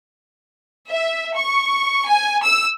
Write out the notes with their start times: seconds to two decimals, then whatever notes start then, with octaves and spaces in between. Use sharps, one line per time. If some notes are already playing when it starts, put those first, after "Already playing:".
0.89 E5
1.37 C#6
2.09 G#5
2.43 E6